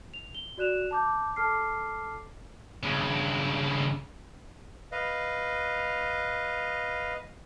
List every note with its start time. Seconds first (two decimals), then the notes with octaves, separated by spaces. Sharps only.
0.14 F7
0.35 G7
0.58 F#4 D5 F#6 E7 F7
0.91 A5 D6 G6
1.36 A4 A5 D6 F6 C7
2.83 G2 C#3
4.92 B4 D#5 F5